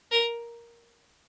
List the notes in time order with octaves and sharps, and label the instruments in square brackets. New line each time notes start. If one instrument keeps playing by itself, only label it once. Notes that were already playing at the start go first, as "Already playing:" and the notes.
[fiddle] A#4